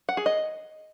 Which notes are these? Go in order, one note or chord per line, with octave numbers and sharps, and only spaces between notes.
F#5
G#4
D#5